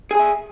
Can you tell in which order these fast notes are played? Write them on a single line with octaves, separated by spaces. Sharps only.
G#4 G#5 E5